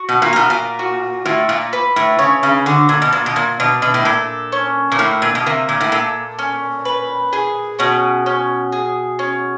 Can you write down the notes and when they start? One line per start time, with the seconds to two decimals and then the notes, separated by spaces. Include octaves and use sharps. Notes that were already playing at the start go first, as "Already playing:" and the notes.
Already playing: F#4
0.09 B2
0.22 A#2
0.33 B2 A#4
0.50 A#2
0.79 F#4
1.25 A2 F4
1.49 A#2
1.73 B4
1.96 A2
2.18 C#3 C#5
2.43 C#3
2.66 D3 F#4
2.89 A#2
3.02 B2
3.12 A#2 D4
3.26 B2
3.36 A#2
3.60 B2 D4
3.82 B2
3.94 A2
4.05 A#2 A4
4.52 C#4
4.92 A#2
4.99 A2 A#3
5.22 A#2
5.35 B2
5.46 C3 A#3
5.69 A#2
5.80 A2
5.92 A#2 A4
6.39 C#4
6.85 B4
7.33 G#4
7.79 B2 C#4
8.26 C#4
8.72 G#4
9.19 C#4